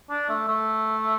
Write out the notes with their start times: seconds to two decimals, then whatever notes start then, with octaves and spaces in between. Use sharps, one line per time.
0.10 D4
0.29 A3
0.48 A3